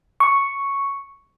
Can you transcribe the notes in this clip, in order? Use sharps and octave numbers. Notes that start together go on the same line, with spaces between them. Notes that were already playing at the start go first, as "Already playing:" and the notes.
C#6